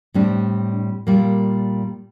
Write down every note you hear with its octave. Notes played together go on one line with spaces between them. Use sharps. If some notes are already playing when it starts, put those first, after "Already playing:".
A2 G3 C4 D4
A#2 G3 A#3